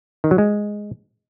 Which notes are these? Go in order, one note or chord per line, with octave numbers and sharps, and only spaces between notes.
D#3
F#3
G#3